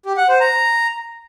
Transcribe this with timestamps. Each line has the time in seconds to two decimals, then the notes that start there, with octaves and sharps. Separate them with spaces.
0.05 G4
0.17 F#5
0.29 C5
0.40 A#5